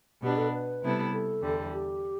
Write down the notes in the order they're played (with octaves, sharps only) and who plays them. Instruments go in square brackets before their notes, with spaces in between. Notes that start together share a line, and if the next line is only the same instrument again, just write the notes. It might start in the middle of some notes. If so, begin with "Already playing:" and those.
[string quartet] B2 B3 D4 [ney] G4
[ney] A4
B4
[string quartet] C3 G3 B3 E4 A4
[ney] A4
[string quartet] E2 D3 G3
[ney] G4